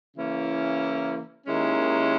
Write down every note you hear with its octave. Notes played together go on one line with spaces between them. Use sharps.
C#3 E3 A#3 C#4 E4
D#2 D#3 G#3 C#4 E4